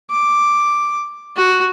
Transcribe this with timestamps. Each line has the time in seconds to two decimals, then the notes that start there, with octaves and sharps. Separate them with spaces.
0.11 D6
1.36 F#4